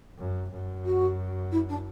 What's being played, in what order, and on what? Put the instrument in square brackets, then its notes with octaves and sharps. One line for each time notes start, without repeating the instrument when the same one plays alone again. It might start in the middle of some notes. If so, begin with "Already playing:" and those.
[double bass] F#2
F#2
[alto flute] F#4
E4
D4